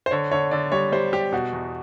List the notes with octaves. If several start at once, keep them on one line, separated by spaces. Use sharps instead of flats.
C5
D3 C#5
D3 C#5
D3 D5
G3 C#5
G3 C5
G3 G4
B2 F#4
E2